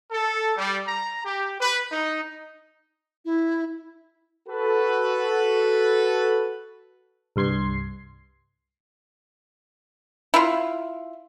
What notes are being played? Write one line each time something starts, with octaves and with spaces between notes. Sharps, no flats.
A4
G3
A#5
G4
B4
D#4
E4
F#4 A4 B4
C2 G2 C6 G#6 C7
E4 F4